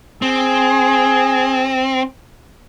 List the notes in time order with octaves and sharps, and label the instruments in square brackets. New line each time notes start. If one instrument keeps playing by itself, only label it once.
[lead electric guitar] C4 [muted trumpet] G#4